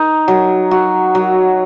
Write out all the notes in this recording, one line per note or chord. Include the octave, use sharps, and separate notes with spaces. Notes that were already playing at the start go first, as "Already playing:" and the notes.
Already playing: D#4
F#3
F#4
F#3